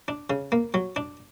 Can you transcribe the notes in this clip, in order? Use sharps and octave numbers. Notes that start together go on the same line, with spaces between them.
D4
C#3
A#3
F#3
D4